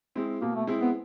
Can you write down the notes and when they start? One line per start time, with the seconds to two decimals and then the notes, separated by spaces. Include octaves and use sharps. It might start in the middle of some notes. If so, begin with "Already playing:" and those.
0.15 G#3 C4 E4
0.41 B2 A#3
0.55 A3
0.67 G#3 C4 E4
0.81 B3